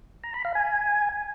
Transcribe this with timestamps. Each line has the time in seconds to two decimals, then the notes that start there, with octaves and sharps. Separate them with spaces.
0.24 A#5
0.34 B5
0.45 F5
0.55 G#5